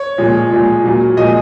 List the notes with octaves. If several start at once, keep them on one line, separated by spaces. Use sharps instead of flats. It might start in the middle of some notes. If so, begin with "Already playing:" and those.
Already playing: C#5
A#2 F3 G#3
A#2 F3 G#3
A#2 F#3
A#2 F3 G#3 D#5